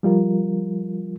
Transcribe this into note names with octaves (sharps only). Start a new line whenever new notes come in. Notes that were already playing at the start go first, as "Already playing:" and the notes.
F3 G3 F4 A#4